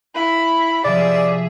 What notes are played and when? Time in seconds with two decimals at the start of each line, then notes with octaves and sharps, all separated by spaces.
0.15 E4 B5
0.85 C3 F3 G#4 D5 E5